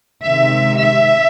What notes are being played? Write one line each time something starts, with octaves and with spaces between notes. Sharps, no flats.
C3 D#3 G#3 E5
E5